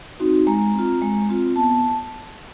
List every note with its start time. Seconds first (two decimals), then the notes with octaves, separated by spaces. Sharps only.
0.20 C4 D#4 F#4
0.47 G#3 A#5
0.74 C4 F4
1.02 G#3
1.29 C4 F4
1.56 B3 A5